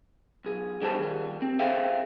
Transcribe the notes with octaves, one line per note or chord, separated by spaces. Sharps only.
B1 G#4
B1 D3 G3 G#4 C5 A5
D#3 G3
C4
G#4 A4 C5 E5 F5 G5